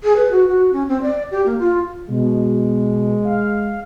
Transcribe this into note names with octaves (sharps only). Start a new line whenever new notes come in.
G#4
B4
F#4
F#4
C#4
C4
D5
G4
A#3
F4
B2 G#3
F5